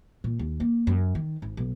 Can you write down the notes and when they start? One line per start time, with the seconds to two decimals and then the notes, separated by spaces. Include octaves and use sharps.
0.24 A#2
0.39 D#2
0.60 A#3
0.87 F#2
1.15 D#3
1.42 G#1
1.57 B1